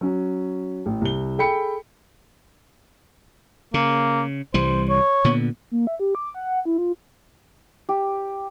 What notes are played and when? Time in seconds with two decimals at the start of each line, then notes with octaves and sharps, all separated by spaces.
0.01 F#3 C#4
0.86 A1
1.01 C2 G7
1.38 G#4 A4 G5 B5 C#7
3.74 C#3 A#3
4.54 C2 E3 G3 C5
4.89 C#5
5.24 A#2 D3 B3
5.71 A#3
5.87 E5
6.00 G4
6.15 D6
6.34 F#5
6.65 E4
6.78 F4
7.89 G4